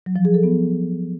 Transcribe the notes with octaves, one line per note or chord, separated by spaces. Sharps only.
F#3
F3
G#4
A4
B3